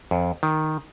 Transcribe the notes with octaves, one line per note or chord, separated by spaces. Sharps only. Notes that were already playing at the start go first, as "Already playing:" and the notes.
F2
D#3